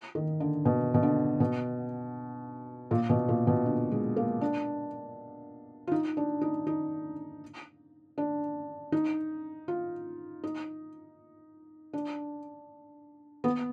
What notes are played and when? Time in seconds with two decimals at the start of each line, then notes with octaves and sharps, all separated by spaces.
0.15 D#3
0.40 D3
0.65 B2
0.94 B2
1.03 D3
1.40 B2
2.91 A#2
3.09 B2
3.29 A#2
3.47 B2
3.66 D3
3.91 G#3
4.16 A#3
4.41 D4
5.87 F4
5.92 D#4
6.17 D4
6.41 D#4
6.67 D#4
8.18 D4
8.92 D#4
9.68 F4
10.44 D#4
11.93 D4
13.44 B3